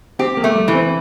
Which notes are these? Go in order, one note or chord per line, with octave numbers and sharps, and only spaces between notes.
C4 G4
A#3
A3
G3
E3
C4